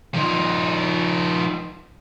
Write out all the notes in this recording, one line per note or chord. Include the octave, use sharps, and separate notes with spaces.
F3 D#4